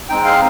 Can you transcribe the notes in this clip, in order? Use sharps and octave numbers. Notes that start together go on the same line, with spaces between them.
G#3 C4 D#4 G5
F5